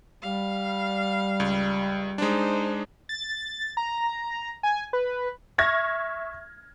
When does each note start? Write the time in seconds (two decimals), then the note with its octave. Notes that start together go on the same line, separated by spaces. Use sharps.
0.22 G3 F5
1.40 C#2
2.18 G#3 D4 D#4 C5
3.09 A6
3.77 A#5
4.63 G#5
4.93 B4
5.58 E5 C#6 F6 G#6 A#6